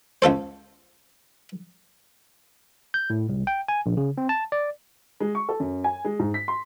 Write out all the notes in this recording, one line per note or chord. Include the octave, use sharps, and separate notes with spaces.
C#2 F4 A4 C5
G6
A2
C2
G5
G#5
A#1
C#3
C4
A5
D5
G#3
C#6
A4
F#2
G#5
G#3
G#2
B6
C6